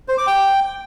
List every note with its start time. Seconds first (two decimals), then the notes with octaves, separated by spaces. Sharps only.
0.08 C5
0.18 D6
0.27 G5